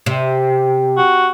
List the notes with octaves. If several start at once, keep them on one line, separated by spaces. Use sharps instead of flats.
C3
F#4